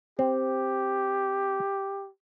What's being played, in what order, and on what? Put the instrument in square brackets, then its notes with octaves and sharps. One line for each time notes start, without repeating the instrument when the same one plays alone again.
[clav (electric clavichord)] C4 [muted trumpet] G4